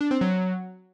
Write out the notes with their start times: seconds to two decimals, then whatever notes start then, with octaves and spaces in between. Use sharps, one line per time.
0.01 D4
0.11 C4
0.21 F#3